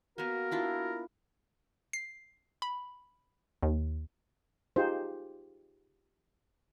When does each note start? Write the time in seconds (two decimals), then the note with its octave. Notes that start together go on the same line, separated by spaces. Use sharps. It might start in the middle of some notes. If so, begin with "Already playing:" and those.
0.18 A#3 B3 F#4 A#4
0.51 D4 E4 F4
1.93 C7
2.62 B5
3.63 D#2
4.76 D#4 F4 G4 G#4 C5